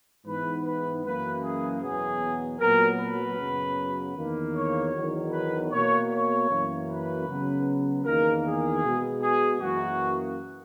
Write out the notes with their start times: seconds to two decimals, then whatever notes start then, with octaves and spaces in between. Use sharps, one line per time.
0.25 G#2 E3 B3 B4
0.64 B4
1.04 F#2 E3 A#3 B4
1.42 G#4
1.81 E2 B2 F#3 B3 G#4
2.59 A#2 F#3 B3 A#4
2.99 B4
3.37 F#2 C#3 F#3 B3
4.16 E2 D#3 A#3
4.54 C#5
4.93 E2 D#3 F#3
5.32 B4
5.71 B2 A#3 C#5
6.11 C#5
6.49 F#2 E3 A#3
6.89 B4
7.28 C#3 F#3 B3
8.04 E2 D#3 A#3 A#4
8.45 G#4
8.83 B2 G#3 B3
9.22 G#4
9.60 F#2 E3 A#3 F#4